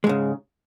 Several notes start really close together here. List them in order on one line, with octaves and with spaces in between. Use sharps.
G#3 G#2 C#3